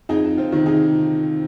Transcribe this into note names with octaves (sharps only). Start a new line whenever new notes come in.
F2 D#4 G#4
C4 F4
C3 D#3
D#4 G#4